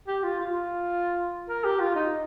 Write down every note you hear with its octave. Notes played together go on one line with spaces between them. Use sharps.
G4
F4
F4
A#4
G4
F4
D#4